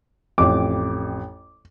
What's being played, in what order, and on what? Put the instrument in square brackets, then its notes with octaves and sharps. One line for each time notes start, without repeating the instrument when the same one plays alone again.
[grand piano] A1 F2 [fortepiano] D6